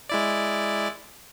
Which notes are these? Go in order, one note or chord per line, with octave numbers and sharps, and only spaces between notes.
G#3 E4 D5